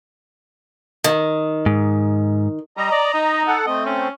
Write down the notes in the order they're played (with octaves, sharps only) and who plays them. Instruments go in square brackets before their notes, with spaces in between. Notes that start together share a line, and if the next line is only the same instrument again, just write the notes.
[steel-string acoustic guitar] D#3
[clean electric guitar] G#2
[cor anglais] G3 [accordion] D#5 A#5
[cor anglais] D5
D#4
[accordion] A4 F#5
[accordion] A3 C4 [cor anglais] D#5
[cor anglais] C#4